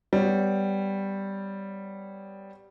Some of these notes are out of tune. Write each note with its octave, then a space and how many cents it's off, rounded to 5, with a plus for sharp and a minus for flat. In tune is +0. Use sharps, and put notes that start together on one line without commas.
G3 +0 B3 +15 C#5 +0